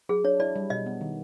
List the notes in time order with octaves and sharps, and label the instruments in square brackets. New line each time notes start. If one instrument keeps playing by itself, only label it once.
[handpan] F#3 [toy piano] G#4
[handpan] D4 [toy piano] C#5
[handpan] E4 [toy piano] D5
[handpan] G3
[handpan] B2 [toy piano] D#5
[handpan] B3
D#3